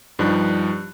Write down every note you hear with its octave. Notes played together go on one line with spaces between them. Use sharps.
G2 F3 G3 D#4 F#6